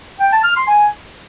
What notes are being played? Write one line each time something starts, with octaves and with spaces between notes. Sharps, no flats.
G5
A5
F6
C6
G#5